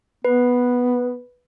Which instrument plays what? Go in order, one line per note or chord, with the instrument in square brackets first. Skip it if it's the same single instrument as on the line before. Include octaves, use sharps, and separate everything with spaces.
[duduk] B3 [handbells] B4